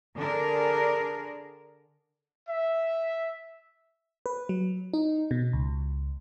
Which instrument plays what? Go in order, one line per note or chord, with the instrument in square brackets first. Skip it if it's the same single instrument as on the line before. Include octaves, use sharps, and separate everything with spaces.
[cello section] D3 D4 G#4 A#4
[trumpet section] E5
[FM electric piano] B4
F#3
D#4
B2
C#2